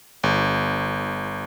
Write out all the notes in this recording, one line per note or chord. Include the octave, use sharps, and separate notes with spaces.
G1